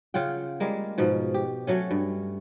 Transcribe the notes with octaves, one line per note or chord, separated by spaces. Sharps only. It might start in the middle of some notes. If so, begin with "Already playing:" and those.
C#3 F4 F#5 G5
G3 G#3 A#3
G#2 B2 F3
G4
F#3 A3 C#4
G2